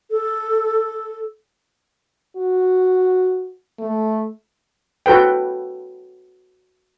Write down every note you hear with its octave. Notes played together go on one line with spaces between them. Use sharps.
A4
F#4
A3
F#4 A4 B4 G5